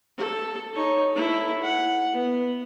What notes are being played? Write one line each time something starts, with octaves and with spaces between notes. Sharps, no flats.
A4
D#4 C#5
E4 A4
F#5
B3